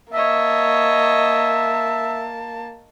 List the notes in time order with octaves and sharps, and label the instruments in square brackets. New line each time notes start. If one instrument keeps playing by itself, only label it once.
[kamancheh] A#3 A5 [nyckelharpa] C#5 D#5 [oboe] E5